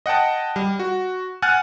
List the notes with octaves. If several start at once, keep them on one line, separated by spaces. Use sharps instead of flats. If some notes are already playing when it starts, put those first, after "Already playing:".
D#5 F#5 G5 A5
G3
F#4
F#5 G#5 F6 F#6 A6